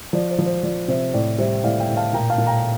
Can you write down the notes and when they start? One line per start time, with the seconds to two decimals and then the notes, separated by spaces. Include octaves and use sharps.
0.13 F3 D5
0.31 C5
0.38 F3
0.46 C5
0.63 F3 D5
0.88 C3 C5 E5
1.13 A2 D5
1.38 G3 C5 E5
1.63 A2 D5 F5
1.80 E5 G5
1.89 A2
1.97 F5 A5
2.13 A#2 G5 A#5
2.30 F5 A5
2.38 A#2
2.47 G5 A#5